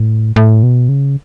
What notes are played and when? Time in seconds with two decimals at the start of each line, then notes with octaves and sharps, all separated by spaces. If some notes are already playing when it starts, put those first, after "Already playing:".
Already playing: A2
0.36 A2
0.63 B2
0.89 C#3